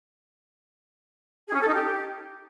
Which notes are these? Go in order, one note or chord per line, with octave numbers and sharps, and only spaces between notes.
G#4
C#4
A4
D#4
G4